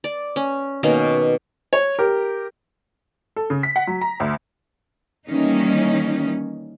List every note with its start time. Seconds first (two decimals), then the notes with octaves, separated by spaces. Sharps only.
0.04 D5
0.36 C#4
0.83 B2 D#3 A#3 C#4
1.73 C#5
1.99 G4 A#4
3.36 A4
3.50 C#3
3.63 B6
3.76 F#5
3.87 F#3
4.01 A#5
4.20 D2
5.29 D#3 E3 G3 A#3 C#4 D#4